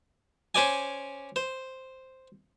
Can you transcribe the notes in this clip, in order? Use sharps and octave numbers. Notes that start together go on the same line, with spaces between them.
C#4 C5 D5 G#5
C5